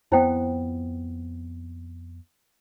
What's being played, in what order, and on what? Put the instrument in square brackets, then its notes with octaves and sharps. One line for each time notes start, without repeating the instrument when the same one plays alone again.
[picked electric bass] F2 B3 [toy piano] E4 C5 G5